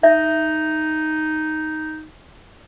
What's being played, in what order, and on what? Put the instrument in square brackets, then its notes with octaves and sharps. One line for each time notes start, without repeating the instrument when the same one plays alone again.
[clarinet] D#4 [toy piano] E5